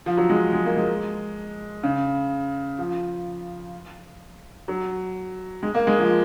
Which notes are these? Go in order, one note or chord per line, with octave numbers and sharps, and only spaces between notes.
F3
F#3
G#3
G#3
A#3
G#3
C#3
F3
F#3
G#3
A#3
G#3
F3